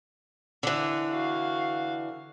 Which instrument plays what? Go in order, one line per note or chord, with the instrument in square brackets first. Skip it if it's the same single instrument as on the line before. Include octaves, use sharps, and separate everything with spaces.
[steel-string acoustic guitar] D3 E3
[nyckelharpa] F#4 F5